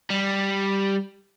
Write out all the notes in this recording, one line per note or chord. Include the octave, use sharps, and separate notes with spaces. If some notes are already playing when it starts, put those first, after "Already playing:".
G3